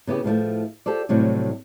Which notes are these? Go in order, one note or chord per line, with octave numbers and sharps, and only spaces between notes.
C#3 B3 E4 G4
A2 F3 G3 A3
F4 G4 A4 C5 D5
A2 C3 F#3 G3